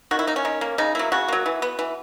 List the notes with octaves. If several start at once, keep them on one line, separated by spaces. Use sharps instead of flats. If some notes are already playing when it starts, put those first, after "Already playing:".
D#3 F#4
E4
A#3 D#4
C#4
D#3
A#3
C#3 D#4
F#3 A#3 E4
C#3 F#4
F#3 A#3
E3
B3
E3